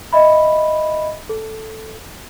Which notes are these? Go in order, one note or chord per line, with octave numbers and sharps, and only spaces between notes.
D#5 E5 B5
A4